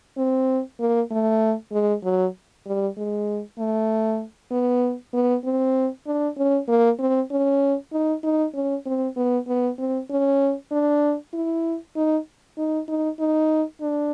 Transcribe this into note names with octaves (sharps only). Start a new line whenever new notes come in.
C4
A#3
A3
G#3
F#3
G3
G#3
A3
B3
B3
C4
D4
C#4
A#3
C4
C#4
D#4
D#4
C#4
C4
B3
B3
C4
C#4
D4
E4
D#4
D#4
D#4
D#4
D4